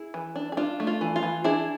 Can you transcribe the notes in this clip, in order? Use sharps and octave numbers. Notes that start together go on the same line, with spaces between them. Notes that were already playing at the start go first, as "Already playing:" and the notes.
Already playing: E4 G#4
E3
D4
G#4
D4 F4
A3
F4
E3
F4
E3
D4 E4 G#4